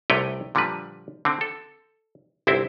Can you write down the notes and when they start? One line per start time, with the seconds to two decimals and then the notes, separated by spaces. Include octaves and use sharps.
0.10 C2 C3 A3 B4 C#5 G5
0.55 A#2 D3 F3 G3 B4
1.25 D3 C4
1.41 A4
2.47 G1 C2 C4 E4 C5